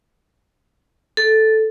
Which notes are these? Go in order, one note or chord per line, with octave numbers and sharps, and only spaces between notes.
A4